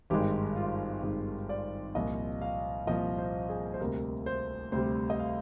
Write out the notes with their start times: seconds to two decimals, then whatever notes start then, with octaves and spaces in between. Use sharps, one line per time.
0.10 G#1 G2 D#3 G#3 G4
0.56 F4
1.03 G#1 G2 D#3 G#3
1.49 D5
1.95 C2 A#2 F3 D#5
2.42 F5
2.87 C2 A#2 F3 D#5
3.18 C5
3.49 G#4
3.74 C5
3.80 D2 C3 G3 A#4
4.26 C5
4.72 D2 C3 G3 C5
5.10 D#5
5.20 F5